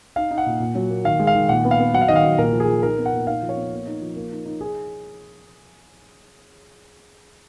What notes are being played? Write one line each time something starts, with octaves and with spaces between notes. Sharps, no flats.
D#4 F5
D#4
F#5
A#2
A#2
F#3
A#3
D#3 F5
G#3
F5
D#3
A#2 F#5
B3
F5
B3
F#3 F#5
F5
D#3 D#5
F5
F#3
A#2 A#4
F3
G#4
F3
D#4 A#4
B3
F#5
A#2
D#4 F5
F3
C#5
B3
A#3
D#4
F3
A#3
D#4
D#4
D#4 G#4